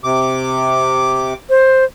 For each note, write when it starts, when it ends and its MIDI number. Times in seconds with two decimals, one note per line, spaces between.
0.04 1.34 48
0.04 1.34 86
1.49 1.84 72